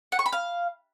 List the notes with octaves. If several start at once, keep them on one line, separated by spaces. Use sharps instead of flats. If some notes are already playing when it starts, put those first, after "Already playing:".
F#5
C#6
B5
F5